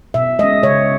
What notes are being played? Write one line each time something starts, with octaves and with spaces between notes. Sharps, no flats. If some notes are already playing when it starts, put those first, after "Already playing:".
B2 E5
G#3 C#4 D#5
C#3 C#5